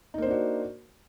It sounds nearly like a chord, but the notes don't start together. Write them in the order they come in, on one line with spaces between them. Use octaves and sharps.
D#4 A#3 C5 D4 F#4